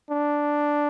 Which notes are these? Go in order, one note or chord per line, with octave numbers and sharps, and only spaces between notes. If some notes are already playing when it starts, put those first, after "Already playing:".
D4